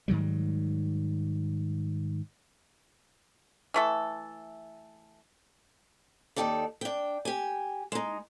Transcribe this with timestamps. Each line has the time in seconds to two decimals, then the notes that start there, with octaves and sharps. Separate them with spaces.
0.08 G#2 D#3 F#3 G3
3.74 E3 A3 A4
6.36 D#2 D#4 G4 A4 D5
6.81 D4 G5
7.25 G4 G#5
7.92 G#3 D#4